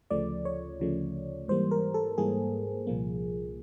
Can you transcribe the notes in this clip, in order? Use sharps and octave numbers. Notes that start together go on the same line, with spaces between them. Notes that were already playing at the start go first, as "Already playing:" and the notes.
D2 C#3 F3 A3 D5
C#5
D2 C#3 F3 A3
G#2 E3 G3 A#3 C5
A#4
A4
G#2 E3 G3 A#3 G#4
C2 A#2 F3 A#3